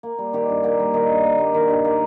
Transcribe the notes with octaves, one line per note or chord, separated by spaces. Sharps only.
A#3
G3
D#3 G4
G2
A#3 G4
G3
D#3 D#4
G2
A#3
G3
D#3
G2
A#3